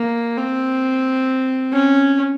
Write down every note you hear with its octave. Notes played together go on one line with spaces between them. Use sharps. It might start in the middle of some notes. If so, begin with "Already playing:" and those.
Already playing: A#3
C4
C#4